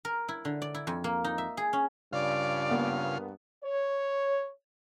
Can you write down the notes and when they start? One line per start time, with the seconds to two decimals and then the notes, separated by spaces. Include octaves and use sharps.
0.05 A#4
0.29 E4
0.45 D3
0.62 D5
0.75 E4
0.87 F2
1.04 A#3
1.24 D#4
1.38 E5
1.57 G#4
1.73 C#4
2.13 G2 C#3 F4 D5 F5
2.71 A#3 B3
3.64 C#5